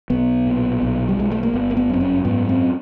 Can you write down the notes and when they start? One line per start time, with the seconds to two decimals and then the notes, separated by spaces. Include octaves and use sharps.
0.10 B1 B3
0.47 A#2
0.82 B1
1.09 G3
1.18 B1 G#3
1.32 A3
1.43 A#3
1.53 G1 B3
1.70 A#3
1.77 B3
1.89 F#2 C4
2.01 C#4
2.25 G#2 B3
2.49 C4